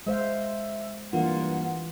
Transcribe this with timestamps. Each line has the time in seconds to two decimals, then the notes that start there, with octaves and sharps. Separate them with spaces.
0.06 G#3 C5 E5 F5
1.13 G2 E3 A#3 F4 F#5